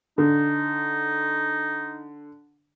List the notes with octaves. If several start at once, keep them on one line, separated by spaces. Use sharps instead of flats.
D3 D#4